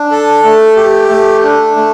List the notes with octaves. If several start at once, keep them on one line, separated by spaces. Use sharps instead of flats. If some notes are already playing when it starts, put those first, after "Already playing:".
Already playing: D4
A4
A3
G4
A3
D4
A3